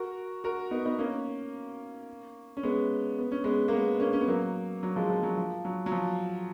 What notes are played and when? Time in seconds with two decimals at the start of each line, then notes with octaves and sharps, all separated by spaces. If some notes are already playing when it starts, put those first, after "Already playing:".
Already playing: F#4 A#4
0.44 F#4 A#4
0.71 B3 D#4
0.85 B3 D#4
0.99 A#3 C#4
2.57 C#4
2.63 G#3 B3
3.19 B3
3.32 C#4
3.44 G#3 B3
3.68 A#3
3.73 G#3 B3
4.00 A#3 C#4
4.13 C#4
4.21 B3
4.27 F#3 A#3
4.83 F#3
4.96 F3 G#3
5.10 F3
5.23 F#3
5.38 F3
5.65 F#3
5.86 F#3
5.92 F3